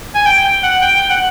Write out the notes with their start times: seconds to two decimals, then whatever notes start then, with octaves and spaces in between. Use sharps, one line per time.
0.15 G#5
0.25 G5
0.44 G5
0.63 F#5
0.81 G5
0.96 G5
1.10 F#5